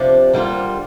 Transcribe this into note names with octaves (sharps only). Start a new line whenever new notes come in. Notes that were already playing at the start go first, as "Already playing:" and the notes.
Already playing: C3 F3 D4
D3 G3 A#3 F4